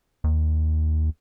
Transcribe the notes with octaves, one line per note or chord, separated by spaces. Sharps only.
D#2